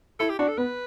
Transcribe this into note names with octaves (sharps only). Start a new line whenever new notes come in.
E4 A4
G4
D4 F#4
A4
B3 B4